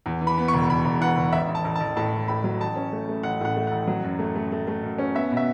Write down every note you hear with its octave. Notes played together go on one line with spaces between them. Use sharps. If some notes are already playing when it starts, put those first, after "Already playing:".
E2
E3
B5
B3
C#6
E1
E1 B5
E1
E3 F#5
E1
A1 E5
A1
A5
A1
A5
A1
A2 A5
A1
A2 B5
F#3
A1 A5
C#4
A3
A3
A1 F#5
A2 F#5
A3
A1 F#5
F#3
F#2
A3
A3
A3
A3
F#2
C#4
B3 E5
B2
E5